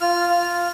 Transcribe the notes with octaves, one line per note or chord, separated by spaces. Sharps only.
F4 F6
F4